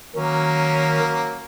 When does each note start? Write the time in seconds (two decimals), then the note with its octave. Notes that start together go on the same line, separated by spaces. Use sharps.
0.15 D#3 F#3 A#3 C#4